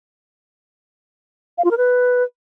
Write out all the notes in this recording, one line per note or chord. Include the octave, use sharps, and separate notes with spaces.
F5
F4
A#4
B4